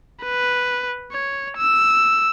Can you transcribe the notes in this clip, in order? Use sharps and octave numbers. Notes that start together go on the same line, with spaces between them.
B4
C#5
E6